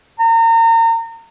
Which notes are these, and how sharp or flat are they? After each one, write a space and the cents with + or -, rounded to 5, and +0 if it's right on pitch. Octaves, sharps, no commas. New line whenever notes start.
A#5 -35